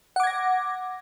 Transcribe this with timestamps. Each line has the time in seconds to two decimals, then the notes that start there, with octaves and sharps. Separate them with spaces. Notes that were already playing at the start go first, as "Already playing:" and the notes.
0.16 F#5
0.20 D6
0.23 G#6
0.27 A#6